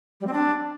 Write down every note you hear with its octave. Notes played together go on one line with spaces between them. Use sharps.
G3
C4
D4